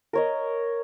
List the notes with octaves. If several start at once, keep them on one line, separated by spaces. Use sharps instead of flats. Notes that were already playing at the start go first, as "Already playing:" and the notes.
A#4 C#5 D#5